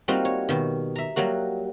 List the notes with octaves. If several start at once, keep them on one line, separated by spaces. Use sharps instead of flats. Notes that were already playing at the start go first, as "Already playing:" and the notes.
G3 A#3 C4 D#4 F4 F#4
C#5
B2 D#3
E5 A#5
F#3 G3 A#3 F#4